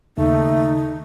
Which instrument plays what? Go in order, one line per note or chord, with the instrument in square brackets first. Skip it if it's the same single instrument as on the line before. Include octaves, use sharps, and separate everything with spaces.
[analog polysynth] D#2 [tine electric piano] C#3 [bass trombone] A3 [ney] D#4